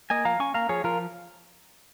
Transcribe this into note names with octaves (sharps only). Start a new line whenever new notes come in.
A#3 D#5 G#5
F3 F5 A#5
C#4 G#5 C#6
A#3 F5 A#5
F3 G#4 C#5
F3 F4 A#4